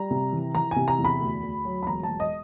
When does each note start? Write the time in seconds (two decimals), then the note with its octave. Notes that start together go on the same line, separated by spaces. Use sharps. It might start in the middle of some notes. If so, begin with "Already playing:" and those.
Already playing: G3 A#5
0.11 C3
0.32 E3
0.55 E3 A#5
0.71 C3 G#5
0.88 A#5
0.98 E2
1.05 B5
1.21 D2
1.43 D2
1.65 F#3
1.83 B5
1.87 E1 A#5
2.03 A5
2.09 E1
2.20 D#5